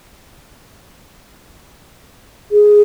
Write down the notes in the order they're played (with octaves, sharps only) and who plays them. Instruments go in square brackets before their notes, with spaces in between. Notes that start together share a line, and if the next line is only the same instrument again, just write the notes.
[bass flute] G#4